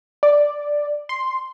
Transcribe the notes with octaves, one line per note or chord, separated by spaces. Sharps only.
D5
C6